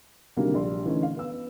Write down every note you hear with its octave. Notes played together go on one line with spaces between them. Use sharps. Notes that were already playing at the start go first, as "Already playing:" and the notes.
C2 D3 D#3 F#3 G3 A#3
A#1 G3 D5 C6
D3 E3 A3 C#4 D#4
F5
B3 E6